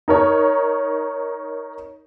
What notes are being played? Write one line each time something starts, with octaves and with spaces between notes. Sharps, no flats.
D#4 A#4 C#5